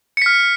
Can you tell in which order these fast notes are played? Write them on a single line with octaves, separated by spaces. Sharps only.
C#7 B6 F6